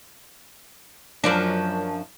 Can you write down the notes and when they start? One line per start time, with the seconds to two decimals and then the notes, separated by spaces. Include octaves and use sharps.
1.24 F#2 F3 D4